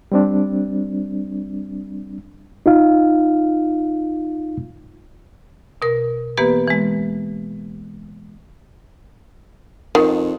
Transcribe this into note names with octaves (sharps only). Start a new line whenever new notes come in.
G3 C4 D4
D#4 F4 F5
B2 A#4
E3 A#3 B3 G4 B4
E3 G#3
F2 D#3